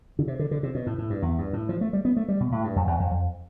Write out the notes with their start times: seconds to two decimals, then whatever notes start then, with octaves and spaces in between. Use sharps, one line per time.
0.19 D3
0.28 C3
0.39 D3
0.51 D3
0.63 C3
0.75 B2
0.87 A2
0.98 A2
1.10 G2
1.22 E2
1.38 G2
1.53 A2
1.69 F3
1.81 A3
1.93 G3
2.05 B3
2.16 A3
2.28 G3
2.40 B2
2.52 A2
2.64 G2
2.76 F2
2.87 E2
3.00 F2
3.11 F2